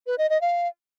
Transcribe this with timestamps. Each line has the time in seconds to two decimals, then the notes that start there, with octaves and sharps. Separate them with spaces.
0.07 B4
0.18 D#5
0.30 D#5
0.41 F5